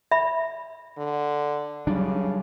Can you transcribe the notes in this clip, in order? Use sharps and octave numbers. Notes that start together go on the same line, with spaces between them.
E5 B5
D3
C#3 F#3 G3 D4